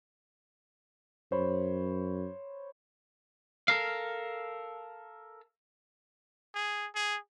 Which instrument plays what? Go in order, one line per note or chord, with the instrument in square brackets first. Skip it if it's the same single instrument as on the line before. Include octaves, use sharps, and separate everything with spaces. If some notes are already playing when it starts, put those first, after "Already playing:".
[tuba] F#2 [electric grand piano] C5 C#5 B5
[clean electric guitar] A4 A#4 F5
[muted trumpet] G#4
G#4